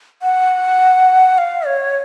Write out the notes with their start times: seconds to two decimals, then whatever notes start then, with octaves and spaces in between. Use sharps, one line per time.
0.22 F#5
1.38 F5
1.66 C#5